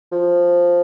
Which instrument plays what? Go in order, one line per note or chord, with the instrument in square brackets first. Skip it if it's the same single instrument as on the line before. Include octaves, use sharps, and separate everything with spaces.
[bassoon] F3